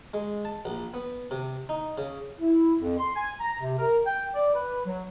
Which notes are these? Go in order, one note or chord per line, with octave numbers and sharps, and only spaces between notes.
G#3
A5
A#1
B3
C3
D#4
C#3
E4
F2
C6
G#5
A#5
C3
A#4
G5
D5
B4
F#3